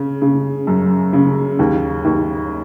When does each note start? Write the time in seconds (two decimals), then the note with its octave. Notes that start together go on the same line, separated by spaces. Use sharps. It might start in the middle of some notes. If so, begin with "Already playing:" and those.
Already playing: C#3
0.22 C#3
0.67 F#2
1.13 C#3
1.59 D#2
2.05 D#2